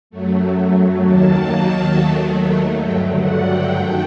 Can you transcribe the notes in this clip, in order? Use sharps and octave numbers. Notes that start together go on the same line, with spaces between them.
F#2 F#3 A3
D#2 D#3 F#3 A#3 A5
D#2 D#3 F#3 A3
G2 D3 F#3 A3 G5
F#5
G5
F#2 D#3 A3 G5